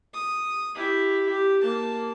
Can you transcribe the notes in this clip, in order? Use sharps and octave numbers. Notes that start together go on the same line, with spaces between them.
D#6
E4 G4
G4
A#3 A5